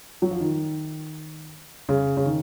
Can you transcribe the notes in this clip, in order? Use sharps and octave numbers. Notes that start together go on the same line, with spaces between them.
F#3
F3
D#3
C#3
C#3
D#3